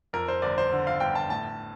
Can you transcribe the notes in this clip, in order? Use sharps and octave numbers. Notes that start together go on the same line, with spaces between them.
F2 A#4
C5
G1 D5
C5
D3
F5
G1 G5
A5
A2 A5